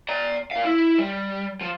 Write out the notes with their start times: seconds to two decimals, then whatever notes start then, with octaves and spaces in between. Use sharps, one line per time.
0.09 D5 A#5
0.51 A#2 F5
0.65 E4
0.98 G3
1.61 F3